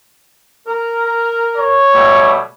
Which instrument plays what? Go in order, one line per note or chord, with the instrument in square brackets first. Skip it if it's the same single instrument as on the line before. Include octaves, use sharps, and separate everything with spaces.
[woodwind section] A#4
[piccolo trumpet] C#5
[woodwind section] B2 G3 A3